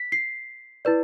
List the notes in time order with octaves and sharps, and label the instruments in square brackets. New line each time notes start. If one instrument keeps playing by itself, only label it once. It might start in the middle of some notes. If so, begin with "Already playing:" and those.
Already playing: [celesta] B6
C7
E4 B4 D5